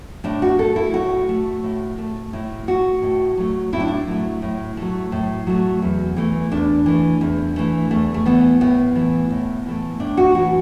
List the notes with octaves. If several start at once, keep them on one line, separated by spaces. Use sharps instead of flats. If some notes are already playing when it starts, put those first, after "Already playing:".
A2 D4
F#4
A3 A4
E4
A2 F#4
A3
A2
A3
A2 E4
A3 F#4
A2
F#3 A3
A2 E4
D4
E4
F#3 A3
A2
F#3 A3
A2
F#3 A3
E2
E3 A3
E2 D4
E3 A3
E2
E3 A3
E2 A3
A3
E3 A3 B3
A2 B3
E3 A3
A2
E3 A3
A2 D4
F#4
E3 A3 F#4